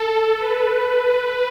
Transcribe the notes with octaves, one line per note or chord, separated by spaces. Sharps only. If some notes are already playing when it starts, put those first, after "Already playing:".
Already playing: A4
B4
B4